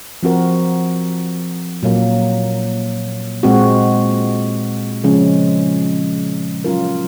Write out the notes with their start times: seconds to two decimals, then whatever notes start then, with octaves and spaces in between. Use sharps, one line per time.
0.23 F3 C4 F#4 A#4
1.83 A#2 F#3 A#3
3.43 A#2 G#3 C4 F#4
5.04 C#3 F3 G#3 C#4
6.64 F#3 C#4 F4 A#4